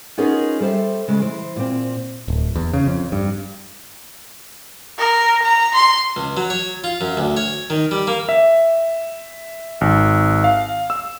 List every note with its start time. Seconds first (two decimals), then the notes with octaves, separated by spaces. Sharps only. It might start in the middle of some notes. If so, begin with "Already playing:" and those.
0.18 B3 C#4 D#4 F4 G#4 A#4
0.60 G3 A4 C5 E5
1.08 C#3 G#3 A3
1.21 E3 C5
1.56 A#2 C4
2.28 D1
2.56 E2
2.73 C#3
2.87 F2
3.12 G2
4.98 A#4
5.42 A#5
5.75 C6
6.17 C#2
6.37 F#3
6.50 C#5
6.84 F4
7.01 F#2
7.17 D2
7.37 C#5
7.70 D#3
7.91 G3
8.07 A#3
8.29 E5
9.81 G#1
10.44 F5
10.90 E6